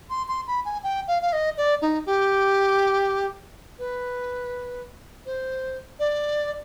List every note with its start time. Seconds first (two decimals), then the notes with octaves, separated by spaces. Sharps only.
0.10 C6
0.28 C6
0.47 B5
0.65 G#5
0.83 G5
1.08 F5
1.22 F5
1.33 D#5
1.58 D5
1.82 D#4
2.06 G4
3.79 B4
5.26 C5
6.00 D5